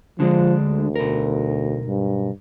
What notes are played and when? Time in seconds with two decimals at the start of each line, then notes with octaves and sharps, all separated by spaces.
0.20 D3 F3 G#3 D4
0.64 D2
0.96 B1 A#4
1.87 G2